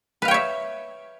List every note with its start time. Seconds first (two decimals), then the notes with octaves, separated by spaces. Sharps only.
0.22 B4
0.25 F5
0.28 G5
0.31 C#5
0.34 E5